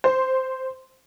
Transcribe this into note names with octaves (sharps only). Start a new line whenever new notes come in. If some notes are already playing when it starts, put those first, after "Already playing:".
C5